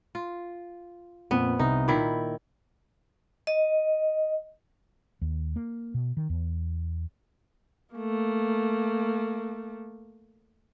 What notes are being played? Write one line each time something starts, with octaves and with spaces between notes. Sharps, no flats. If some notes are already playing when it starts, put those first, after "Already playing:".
F4
F2 A#2 B3
C2 D#4
A#2 D#3 E4 B5
D#5
D#2
A#3
B2
D#3
E2
A3 A#3